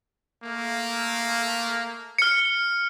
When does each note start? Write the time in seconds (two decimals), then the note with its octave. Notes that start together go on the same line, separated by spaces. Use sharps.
0.43 A3 A#3
2.18 F6 C#7